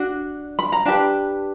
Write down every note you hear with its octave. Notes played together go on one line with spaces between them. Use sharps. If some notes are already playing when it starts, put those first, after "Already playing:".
Already playing: D4 F#4
B5
A#5
D4 G4 B4 A5